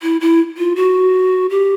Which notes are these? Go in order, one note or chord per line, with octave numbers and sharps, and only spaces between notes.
E4
E4
F4
F#4
G4